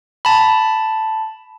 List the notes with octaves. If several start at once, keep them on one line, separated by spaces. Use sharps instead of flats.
A5 B5